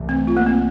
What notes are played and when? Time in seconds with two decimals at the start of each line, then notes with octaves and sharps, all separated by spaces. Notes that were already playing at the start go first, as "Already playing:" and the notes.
Already playing: C2 C3 E3 A3
0.09 C4
0.27 F4
0.37 A#3
0.46 C4